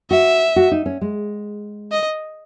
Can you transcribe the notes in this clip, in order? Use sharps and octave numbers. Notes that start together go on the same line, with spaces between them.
F#4 E5
F#4
D#4
C#4
G#3
D#5